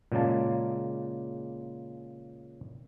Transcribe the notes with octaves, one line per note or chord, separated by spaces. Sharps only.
A#2 C#3 G#3 A#3 A5